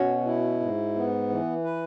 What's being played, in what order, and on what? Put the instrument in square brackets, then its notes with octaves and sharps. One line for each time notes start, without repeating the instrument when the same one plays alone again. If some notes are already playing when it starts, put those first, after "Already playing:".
Already playing: [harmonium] B2 [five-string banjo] C#4 F#4
[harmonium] E4
G#2
B3
E3
B4